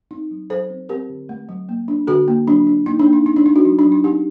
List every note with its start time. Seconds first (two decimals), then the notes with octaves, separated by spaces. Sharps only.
0.11 C4 D#4
0.31 F#3
0.50 F#3 A4 C5
0.70 C4
0.89 C4 G4 A#4
1.09 D3
1.29 A3
1.49 F#3
1.69 A#3
1.88 D4
2.07 D3 F#4 A4
2.28 A#3
2.47 F#3 D4
2.67 D4
2.86 A#3 D#4
2.99 D4
3.06 A#3
3.13 D#4
3.25 C4 D#4
3.36 D4
3.46 A3 D#4
3.56 D4 F#4
3.65 F#3 D#4
3.79 D4
3.85 F#3
3.92 D#4
4.04 C4 D#4 G4